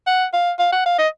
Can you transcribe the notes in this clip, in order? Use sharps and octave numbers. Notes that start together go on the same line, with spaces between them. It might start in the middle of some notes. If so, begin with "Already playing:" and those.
F#5
F5
F5
F#5
F5
D#5